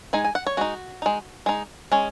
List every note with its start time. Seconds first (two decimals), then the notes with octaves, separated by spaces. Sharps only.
0.13 G#3 D#4 G#5
0.25 G#5
0.35 F#5
0.47 C#5
0.57 G#3 D#4 F#4
1.02 G#3 D#4
1.46 G#3 D#4
1.92 G#3 C#4